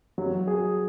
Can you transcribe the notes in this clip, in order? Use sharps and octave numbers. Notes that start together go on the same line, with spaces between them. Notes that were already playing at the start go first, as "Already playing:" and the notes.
F#3
G#4